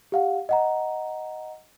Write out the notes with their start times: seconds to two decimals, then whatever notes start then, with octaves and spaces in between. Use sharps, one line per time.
0.12 G4 F5 F#5
0.49 D#5 F#5 A#5